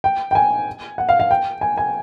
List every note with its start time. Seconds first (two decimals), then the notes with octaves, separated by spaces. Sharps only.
0.04 G5
0.31 G5
0.35 G#5
0.98 F#5
1.09 F5
1.20 F5
1.31 G5
1.61 G#5
1.78 G#5